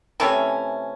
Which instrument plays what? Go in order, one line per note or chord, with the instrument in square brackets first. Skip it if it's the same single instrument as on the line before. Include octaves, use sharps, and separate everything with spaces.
[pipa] C3 E3 A3 C#4